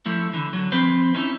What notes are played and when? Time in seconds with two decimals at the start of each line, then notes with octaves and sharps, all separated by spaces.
0.06 F3 A3 E4
0.34 D3 E3
0.53 D3 F#3
0.72 F3 C4 B4 C5
1.15 C#4 D#4 E4